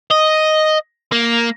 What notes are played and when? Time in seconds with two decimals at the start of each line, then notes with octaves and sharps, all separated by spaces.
0.11 D#5
1.12 A#3